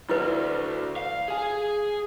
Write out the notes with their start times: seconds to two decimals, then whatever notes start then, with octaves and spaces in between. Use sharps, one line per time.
0.09 D2 E4 B4
0.96 F5
1.28 G#4 G#5